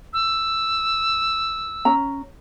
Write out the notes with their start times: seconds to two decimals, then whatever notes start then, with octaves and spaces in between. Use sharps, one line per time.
0.13 E6
1.85 C#4 A#5